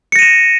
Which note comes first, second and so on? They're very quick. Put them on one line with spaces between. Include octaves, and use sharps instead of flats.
C#7 A#6 D#7 E7